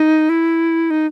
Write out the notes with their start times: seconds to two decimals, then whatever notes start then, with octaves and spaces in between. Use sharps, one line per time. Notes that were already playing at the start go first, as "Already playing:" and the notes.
Already playing: D#4
0.29 E4
0.91 D#4